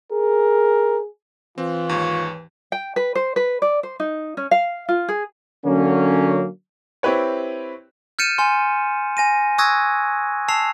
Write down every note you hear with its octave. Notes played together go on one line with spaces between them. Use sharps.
G#4 A#4
E3 C4 F4
D#2 G#2 C#5
G5
B4
C5
B4
D5
C5
D#4
C#4
F5
F4
G#4
D3 F#3 A#3 C#4
C4 E4 G4 B4 C#5
F6 G6 A6 C#7 D#7 E7
G#5 C6
G#5 A#6 D#7
C#6 D#6 E6 F#6 G#6 A#6
A5 E6 C7 F7